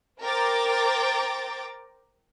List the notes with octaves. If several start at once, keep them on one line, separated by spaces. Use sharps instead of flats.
A#4 C5 G5 A#5 D6 A6